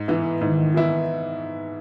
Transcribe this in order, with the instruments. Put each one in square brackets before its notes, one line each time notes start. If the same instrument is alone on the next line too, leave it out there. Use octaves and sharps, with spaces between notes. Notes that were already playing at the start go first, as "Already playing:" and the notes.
Already playing: [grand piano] G#2
E3 B3 E4
[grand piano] G#2 [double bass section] D#3
[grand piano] E3 B3 E4